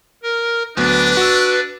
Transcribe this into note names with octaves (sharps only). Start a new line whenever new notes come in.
A#4
D2 F#3 B3 D4 B4
F#4 E6